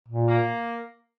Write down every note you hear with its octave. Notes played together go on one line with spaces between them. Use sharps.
A#2
A#3